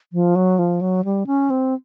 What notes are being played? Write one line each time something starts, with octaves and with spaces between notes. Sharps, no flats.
F3
F#3
F3
F#3
G3
C#4
C4